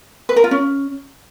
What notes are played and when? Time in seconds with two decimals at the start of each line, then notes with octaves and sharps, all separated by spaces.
0.29 B4
0.36 A#4
0.44 F4
0.51 C#4